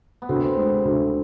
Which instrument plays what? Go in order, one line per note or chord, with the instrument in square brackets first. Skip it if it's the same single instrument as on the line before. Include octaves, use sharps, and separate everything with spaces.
[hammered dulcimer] B3
[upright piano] D2 [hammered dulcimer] C4
[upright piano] G#3
D2